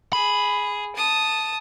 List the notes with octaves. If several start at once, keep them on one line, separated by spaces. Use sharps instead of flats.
G#4 B5
A5 D#6